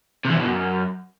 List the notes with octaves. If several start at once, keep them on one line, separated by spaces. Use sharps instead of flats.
C3
E3
C3
B2
F#2